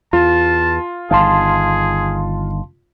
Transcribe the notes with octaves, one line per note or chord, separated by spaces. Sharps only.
E2 F4 A5
G1 D#3 G#4 F5 A5 C6